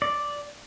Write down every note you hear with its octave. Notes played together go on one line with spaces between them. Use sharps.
D5